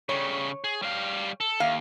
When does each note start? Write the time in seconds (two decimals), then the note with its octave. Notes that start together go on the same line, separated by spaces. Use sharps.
0.09 C#3 G3 C#5
0.64 G#4
0.82 G3 F5
1.40 A4
1.60 D#2 F5